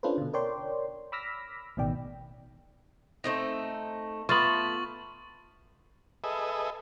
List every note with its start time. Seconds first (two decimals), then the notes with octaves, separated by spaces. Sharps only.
0.03 C#4 D4 F4 A4 B4 C5
0.18 B2 D3
0.33 A#4 C#5 D5 G5 C6
1.12 B5 D6 E6 F6 A#6 B6
1.77 A1 B2 D#3 D5 G5
3.24 A3 C4 D#4
4.29 A3 B3 F4 C#6 A6 F#7
6.24 G#4 A4 B4 D#5 E5